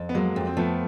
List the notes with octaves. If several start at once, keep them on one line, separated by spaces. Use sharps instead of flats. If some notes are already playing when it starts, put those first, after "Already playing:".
Already playing: F2
B3
F#3 G#3 A#3
F2
C4
F3 A3 B3